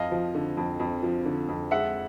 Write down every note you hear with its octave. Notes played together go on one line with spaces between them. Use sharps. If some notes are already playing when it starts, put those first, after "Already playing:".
Already playing: F2 D#5 F5
F3
D3
F2
F2
F3
D3
F2
G#3 E5 F#5